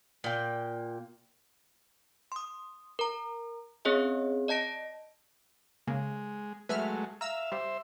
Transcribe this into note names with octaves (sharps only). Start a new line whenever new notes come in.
A#2 G5
C6 D#6
A#4 A#5
C4 C#4 G#4 C#5 D#5
D5 D#5 A5 A#6 D7
C#3 G#3 A#3
F#3 G#3 A3 B4 E5 F6
E5 F5 A#5 E6
G3 C5 E5